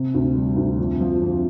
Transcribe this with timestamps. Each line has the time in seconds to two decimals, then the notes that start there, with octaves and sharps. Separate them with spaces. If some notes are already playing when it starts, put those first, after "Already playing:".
Already playing: C3
0.14 D2
0.35 G3
0.56 D2
0.78 F2
1.00 F3
1.22 F2